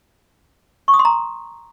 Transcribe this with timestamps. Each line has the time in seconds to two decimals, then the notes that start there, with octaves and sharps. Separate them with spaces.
0.88 C#6
0.94 D#6
0.99 C6
1.05 A#5